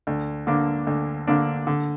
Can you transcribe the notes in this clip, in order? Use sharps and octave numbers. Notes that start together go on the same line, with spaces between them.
D2
D3 A#3 D4
D2
D3 A#3 D4
D3